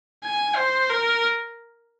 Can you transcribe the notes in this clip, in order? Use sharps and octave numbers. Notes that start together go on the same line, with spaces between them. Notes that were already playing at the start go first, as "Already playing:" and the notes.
G#5
C5
A#4